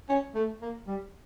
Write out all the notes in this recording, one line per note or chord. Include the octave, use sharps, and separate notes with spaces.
C#4
A3
A#3
G3